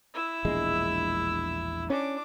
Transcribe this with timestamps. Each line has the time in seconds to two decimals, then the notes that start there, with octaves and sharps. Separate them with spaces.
0.14 E4 E5
0.45 E1 A#1 G#3
1.90 C#4 D4 D6